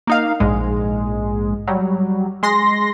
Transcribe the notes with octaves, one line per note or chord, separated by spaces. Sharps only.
A#3 D#4 F5
A#1 G#2 G#3
F#3 G3
G#3 C6 A#6